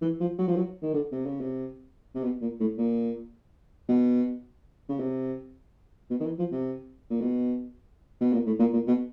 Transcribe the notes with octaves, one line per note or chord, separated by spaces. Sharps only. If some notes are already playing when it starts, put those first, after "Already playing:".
E3
F3
F#3
F3
F#3
D#3
D3
C3
C#3
C3
C3
B2
A#2
A2
A#2
B2
C#3
C3
B2
D#3
E3
F3
C3
A#2
B2
B2
A#2
A2
A#2
A#2
B2